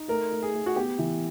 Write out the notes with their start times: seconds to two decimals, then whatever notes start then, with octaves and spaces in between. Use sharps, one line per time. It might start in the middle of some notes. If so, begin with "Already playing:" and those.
Already playing: D#4
0.08 A3 A#4
0.31 A3
0.43 G#4
0.54 A3
0.66 F#4
0.76 B3 G4
0.99 E3